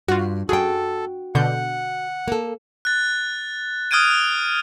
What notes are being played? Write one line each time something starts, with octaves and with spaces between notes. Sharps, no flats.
G2 F4 F#4
F#2 F#4 G#4 A4 G5
B2 D3 F#5 G6
A#3 A4
F#6 A6
D#6 F6 F#6 G#6 D7 D#7